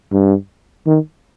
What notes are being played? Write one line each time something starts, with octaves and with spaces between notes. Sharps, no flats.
G2
D#3